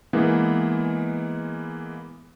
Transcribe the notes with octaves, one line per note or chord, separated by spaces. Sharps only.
E3 G#3 A#3 B3